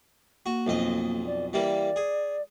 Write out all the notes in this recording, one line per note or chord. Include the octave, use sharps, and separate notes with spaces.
A#3 F#4
B1 F2 D#5
D5
E3 G3 A#3 D5
G#4